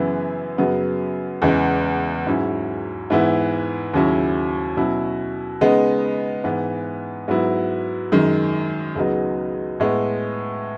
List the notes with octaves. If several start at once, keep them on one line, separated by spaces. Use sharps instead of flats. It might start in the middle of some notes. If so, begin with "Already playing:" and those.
Already playing: F#2 C#3 E3 B3 E4
F#2 C#3 F#3 B3
E2 C#3 E3 G#3
G#2 F#3 C#4 E4
G#2 E3 B3 E4
D#2 C#3 F#3 C#4 E4
B2 F#3 C#4 E4
C#3 G#3 B3 D#4
G#2 E3 B3
G#2 F#3 B3 E4
F#2 D#3 G#3
C#2 C#3 F#3 B3 D#4
A2 G#3 B3